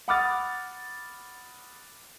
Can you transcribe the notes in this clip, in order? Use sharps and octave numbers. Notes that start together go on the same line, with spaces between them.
F#5 B5 D6 D#6 F6 A6